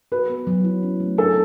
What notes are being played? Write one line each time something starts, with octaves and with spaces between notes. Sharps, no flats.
F#4 B4
B3
F#3
E4
C#4
A3
D4 A4